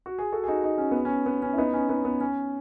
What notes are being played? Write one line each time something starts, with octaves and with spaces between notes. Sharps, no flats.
F#4
G#4
F#4 A4
G#4
D#4 F#4
D#4
C#4
B3
C#4
B3
C#4
E4
B3 D#4
C#4
B3 D#4
B3
C#4